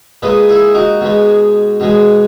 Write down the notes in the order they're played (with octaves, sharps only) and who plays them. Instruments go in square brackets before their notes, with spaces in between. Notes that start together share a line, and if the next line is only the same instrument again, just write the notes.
[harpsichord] A#2 G#3 B4 D#5
E4 G#4
D#4 F#4
B2 G#3
B2 G#3